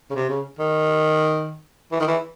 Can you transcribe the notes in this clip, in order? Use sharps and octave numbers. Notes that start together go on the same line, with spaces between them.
C#3
C3
C#3
D#3
E3
D#3
E3